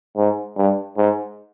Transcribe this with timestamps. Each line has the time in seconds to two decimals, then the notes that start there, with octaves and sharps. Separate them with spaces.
0.17 G#2
0.57 G2
0.97 G#2